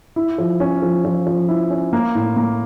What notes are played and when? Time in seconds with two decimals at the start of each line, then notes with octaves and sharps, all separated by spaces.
0.16 E4
0.38 F3
0.60 C#4
0.82 F3
1.05 F3
1.27 F3
1.49 E4
1.70 C#4
1.93 A#3
2.15 A2
2.37 A#3